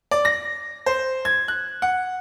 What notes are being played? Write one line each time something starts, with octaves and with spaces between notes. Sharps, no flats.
D5
A#6
C5
G#6
F#6
F#5